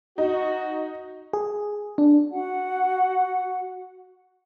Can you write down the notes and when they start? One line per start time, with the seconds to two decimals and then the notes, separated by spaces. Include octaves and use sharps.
0.18 D#4 F#4
1.33 G#4
1.98 D4
2.30 F#4 F#5